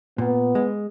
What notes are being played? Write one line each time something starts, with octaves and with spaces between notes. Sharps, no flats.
A#2 B3
G#3